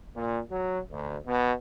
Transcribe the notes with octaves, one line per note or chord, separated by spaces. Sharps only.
A#2
F#3
D2
B2